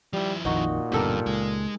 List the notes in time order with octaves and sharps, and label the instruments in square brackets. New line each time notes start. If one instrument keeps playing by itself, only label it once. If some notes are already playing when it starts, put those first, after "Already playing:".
[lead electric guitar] F3 E4 [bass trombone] G3
[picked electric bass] A#1 F2 D#3 [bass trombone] A#2 [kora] D#4 F#4
[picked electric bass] D#1 B2 D3 [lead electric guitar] G2 [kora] G4 A4 A#4
[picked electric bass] C#2 [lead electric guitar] G#3